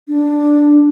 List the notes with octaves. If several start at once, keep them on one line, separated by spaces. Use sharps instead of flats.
D4